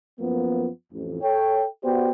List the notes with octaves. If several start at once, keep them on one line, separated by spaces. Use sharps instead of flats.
F#2 F3 A#3 B3
A1 F2
A4 C#5 G5
B3 F#4 G4 C5 D5 G5